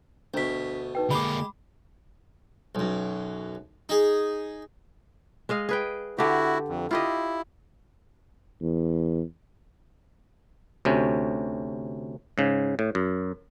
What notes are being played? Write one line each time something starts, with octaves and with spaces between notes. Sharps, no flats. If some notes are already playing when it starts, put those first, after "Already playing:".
D2 B2 D4 B6
D#4 B4 G5
D3 G#3 A#3 G4 B5 D6
B1 F#2
D#4 G#4
G#3 D#5 F5
G#4 B4 G5
D3 E4 F#4 G4
F2
E4 F4 G4 D#5
E2
D2 C3 C#4
G#2 C#3
A2
F#2